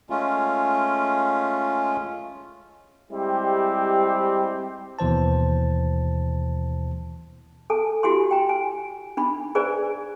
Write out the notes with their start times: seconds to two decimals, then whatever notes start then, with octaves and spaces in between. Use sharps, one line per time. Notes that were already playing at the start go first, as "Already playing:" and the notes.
0.10 G#3 A3 C#4 F4
3.12 G3 G#3 C4 E4 G4
4.99 D#2 B2 E3 C5 A5
7.70 A4 G#5 A5
8.03 E4 F#4 G4 G#5 C6
8.31 G5 A#5
8.49 G#5
9.17 D4 D#4 B5
9.55 G#4 B4 C5 D5 G#5 A#5